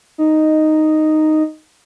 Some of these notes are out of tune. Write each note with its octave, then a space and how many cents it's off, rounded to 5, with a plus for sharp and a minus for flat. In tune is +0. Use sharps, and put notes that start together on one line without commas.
D#4 -5